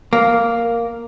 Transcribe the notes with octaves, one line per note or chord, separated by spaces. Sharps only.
A#3